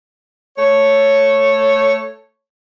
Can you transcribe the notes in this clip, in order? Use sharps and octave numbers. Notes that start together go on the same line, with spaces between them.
A3 A4 C#5